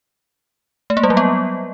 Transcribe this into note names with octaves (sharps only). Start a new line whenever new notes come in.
A3
A#3
G3
F#3
B3